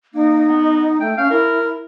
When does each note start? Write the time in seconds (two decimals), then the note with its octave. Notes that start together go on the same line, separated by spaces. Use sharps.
0.14 A#3 D#4
0.49 B3
1.01 A3 G5
1.18 C#4 F5
1.31 E4 A#4